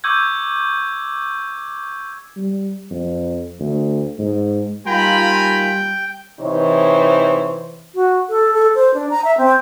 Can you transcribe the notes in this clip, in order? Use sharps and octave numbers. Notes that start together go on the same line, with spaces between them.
C#6 D6 E6 G6 G#6
G3
F2
D2
G#2
G3 A#3 D#4 F4 G5 G#5 A#5 B5
C3 E3 D#4 C5 C#5
F#4
A4
A4
C5
D4
A#5
E5
C4